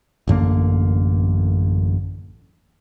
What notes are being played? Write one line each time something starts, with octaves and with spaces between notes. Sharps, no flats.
A1 F#2 D3 A#3